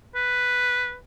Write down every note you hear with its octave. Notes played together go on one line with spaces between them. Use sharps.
B4